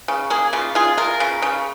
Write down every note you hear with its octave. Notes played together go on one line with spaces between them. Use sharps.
C#3
A#3 G#4
C#3 F4
F4 G#4
F4 A#4
C#3
C#3